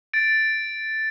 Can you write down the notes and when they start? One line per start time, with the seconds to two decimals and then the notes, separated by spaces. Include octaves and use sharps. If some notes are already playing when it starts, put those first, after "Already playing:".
0.13 A6 D7